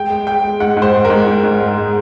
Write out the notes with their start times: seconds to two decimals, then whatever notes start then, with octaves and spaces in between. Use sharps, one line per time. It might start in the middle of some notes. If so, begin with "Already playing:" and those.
Already playing: G#3 G5
0.10 G#3
0.26 G#3 G5
0.43 G#3
0.60 G#2 F#5
0.77 G#2
0.82 C5
0.94 G#3
1.05 A#4
1.10 G#2
1.27 G#2
1.44 G#2
1.60 G#3
1.77 G#3